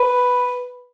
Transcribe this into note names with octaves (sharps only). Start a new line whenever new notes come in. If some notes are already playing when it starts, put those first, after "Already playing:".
Already playing: B4